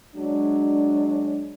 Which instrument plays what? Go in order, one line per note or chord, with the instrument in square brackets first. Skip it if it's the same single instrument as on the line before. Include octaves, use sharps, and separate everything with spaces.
[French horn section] F#3 G#3 D4